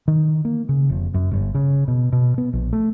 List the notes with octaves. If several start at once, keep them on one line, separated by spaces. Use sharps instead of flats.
D#3
A#3
C#3
F1
F#2
G1
C#3
B2
B2
B3
A#1
A3